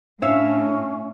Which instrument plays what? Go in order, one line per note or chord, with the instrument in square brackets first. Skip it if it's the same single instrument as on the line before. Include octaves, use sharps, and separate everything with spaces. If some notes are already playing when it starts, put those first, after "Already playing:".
[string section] A2 [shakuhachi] C#4 [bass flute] D4 [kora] C#5 E5 F5